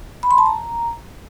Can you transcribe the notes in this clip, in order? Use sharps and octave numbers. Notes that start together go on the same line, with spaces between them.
B5
C6
A5
A#5